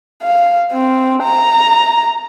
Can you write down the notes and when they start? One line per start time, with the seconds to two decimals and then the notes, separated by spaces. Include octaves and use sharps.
0.23 F5
0.72 C4
1.23 A#5